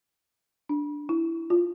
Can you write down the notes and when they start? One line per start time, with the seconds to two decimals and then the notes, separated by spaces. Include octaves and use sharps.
0.69 D4
1.09 E4
1.50 F4